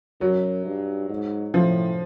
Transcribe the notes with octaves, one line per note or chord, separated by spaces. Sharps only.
F#2 F#3
G2
G#2
A2 F3